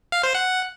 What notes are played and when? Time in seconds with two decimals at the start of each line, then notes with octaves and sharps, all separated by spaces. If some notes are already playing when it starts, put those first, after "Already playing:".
0.12 F5
0.23 C5
0.35 F#5